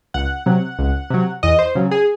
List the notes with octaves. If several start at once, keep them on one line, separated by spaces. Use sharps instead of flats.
C#2 F#5
C3 F#3
C#2
C3 F#3
E2 D#5
C5
C#3 F#3
G#4